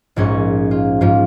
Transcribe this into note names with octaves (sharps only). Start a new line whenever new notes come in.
A#1 G#2 C#4 D#4 C#6
F4
G#2 F3 F4